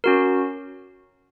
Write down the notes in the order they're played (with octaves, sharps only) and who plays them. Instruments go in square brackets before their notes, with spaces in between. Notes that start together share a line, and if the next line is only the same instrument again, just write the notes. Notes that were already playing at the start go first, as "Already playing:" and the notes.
[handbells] C#4 F#4 A#4